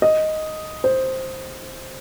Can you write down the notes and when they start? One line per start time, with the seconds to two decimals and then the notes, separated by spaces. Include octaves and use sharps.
0.02 D#5
0.84 C5